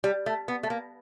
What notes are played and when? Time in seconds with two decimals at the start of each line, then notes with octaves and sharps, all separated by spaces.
0.04 G3
0.26 A3
0.48 B3
0.63 A3
0.70 A#3